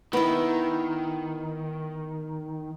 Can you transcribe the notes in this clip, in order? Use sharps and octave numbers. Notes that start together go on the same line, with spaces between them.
D#3 B3 E4